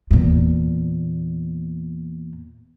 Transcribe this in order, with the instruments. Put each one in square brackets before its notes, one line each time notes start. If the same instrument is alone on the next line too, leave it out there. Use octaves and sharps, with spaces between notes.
[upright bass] E2 A#2